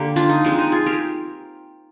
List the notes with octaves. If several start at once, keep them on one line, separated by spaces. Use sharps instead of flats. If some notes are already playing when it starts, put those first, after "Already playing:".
Already playing: D3 A#3 G4
D4 F4
D#4
F3 G#3 C4 D4
D#4
F4 G#4
G4 A#4